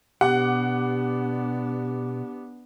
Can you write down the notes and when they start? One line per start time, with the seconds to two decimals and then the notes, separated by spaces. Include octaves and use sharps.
0.21 B2 B3 D4 G4 F#5 D6